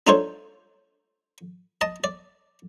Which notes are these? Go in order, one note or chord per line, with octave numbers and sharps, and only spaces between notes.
D4 D#4 F4 A4 C5 C#5
D#5 A5
D5